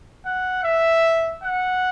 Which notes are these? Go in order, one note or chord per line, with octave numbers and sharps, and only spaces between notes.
F#5
E5
F#5